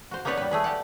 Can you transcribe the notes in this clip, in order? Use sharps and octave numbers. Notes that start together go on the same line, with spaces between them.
F#4 C5
A#3 B3 D#4 B4 C#5 D5
G3 B4
A3 G#4 B4
G4 D5 F#5